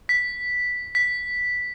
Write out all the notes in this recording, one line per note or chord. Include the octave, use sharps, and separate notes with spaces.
B6
B6